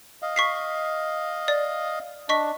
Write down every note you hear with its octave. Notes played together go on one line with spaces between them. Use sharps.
D#5 F5
C#6 B6 C7
D5
D4 D#5 C#6 B6